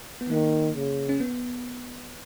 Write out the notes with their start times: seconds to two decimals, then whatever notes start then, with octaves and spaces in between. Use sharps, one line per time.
0.21 B3
0.30 D#3 A#3
0.76 C#3
1.09 C#4
1.20 B3